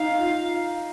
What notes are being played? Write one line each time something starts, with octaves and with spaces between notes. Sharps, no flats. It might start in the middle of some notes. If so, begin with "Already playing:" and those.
Already playing: D#4 F5
F4